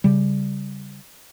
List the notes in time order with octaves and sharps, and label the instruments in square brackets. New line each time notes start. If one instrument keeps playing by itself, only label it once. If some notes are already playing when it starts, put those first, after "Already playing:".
[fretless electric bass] C#3 G3